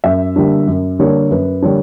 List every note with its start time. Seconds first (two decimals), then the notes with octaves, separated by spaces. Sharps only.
0.04 F#2 E5
0.36 D3 G3 A#3 D4
0.67 F#2
0.99 D3 G3 A#3 D4 C#5
1.31 F#2 B4
1.62 D3 G3 A#3 D4 C#5